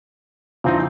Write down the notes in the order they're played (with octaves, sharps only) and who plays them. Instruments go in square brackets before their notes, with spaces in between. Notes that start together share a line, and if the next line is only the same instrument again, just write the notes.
[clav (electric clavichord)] A#2 C4 D#4 [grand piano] D3 F3 E4